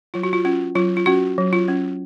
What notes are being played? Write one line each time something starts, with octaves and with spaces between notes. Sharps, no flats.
F#3 F4
F#4
F4
C#4 F4
F#3 F4
F4
C#4 F#4
F#3
F4
C#4